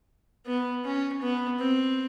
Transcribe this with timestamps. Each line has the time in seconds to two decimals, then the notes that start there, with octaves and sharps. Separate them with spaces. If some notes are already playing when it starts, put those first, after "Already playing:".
0.46 B3
0.85 C#4
1.21 B3
1.60 C4